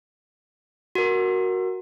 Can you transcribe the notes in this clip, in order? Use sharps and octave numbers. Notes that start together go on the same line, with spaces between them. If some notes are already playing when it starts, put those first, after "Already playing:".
F#4 A#4